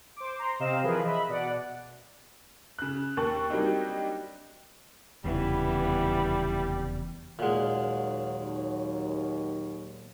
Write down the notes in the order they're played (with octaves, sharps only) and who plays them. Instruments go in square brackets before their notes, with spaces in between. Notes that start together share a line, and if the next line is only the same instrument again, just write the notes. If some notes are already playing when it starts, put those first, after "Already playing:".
[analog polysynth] C5 D6
A#5 C6
C3 C4 D#5 F5 E7
E3 F3 G#4 A#4 B4
D#5 E5 B5
B2 D5 F#5
[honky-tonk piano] C#3 F#6
D#2 A#3 A5 C#6 F#6
F#3 G3 A#3 C4 D4 D#4
[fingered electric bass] F1 E2 C#3 [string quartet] E3 B3 E4 [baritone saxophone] G3
[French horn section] D#2 F#3 [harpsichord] A#2 G#3 [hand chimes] F5 F#5